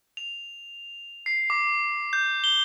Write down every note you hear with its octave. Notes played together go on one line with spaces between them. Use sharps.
F7
C7
D6
G6
G7